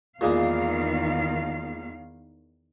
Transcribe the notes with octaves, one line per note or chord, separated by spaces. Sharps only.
E2 A#2 D#3 G#3 A#3 F5